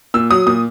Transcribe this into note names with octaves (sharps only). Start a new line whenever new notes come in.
A#2 E6
F#3 D#6
A#2 D#6